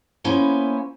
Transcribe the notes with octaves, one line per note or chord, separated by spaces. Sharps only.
A#3 B3 C#4 E4 C5 G#5